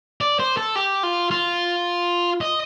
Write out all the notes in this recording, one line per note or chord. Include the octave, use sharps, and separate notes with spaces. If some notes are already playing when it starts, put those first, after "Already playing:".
D5
C5
A4
G4
F4
F4
D#5